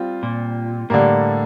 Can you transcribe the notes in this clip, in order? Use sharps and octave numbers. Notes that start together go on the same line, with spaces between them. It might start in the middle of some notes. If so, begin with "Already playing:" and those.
Already playing: G3 C4 F4
A#2
A2 D3 G3 A#3